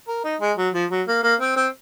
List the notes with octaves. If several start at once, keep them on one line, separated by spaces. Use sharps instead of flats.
A#4
D#4
G#3
F#3
F3
F#3
A#3
A#3
C4
C4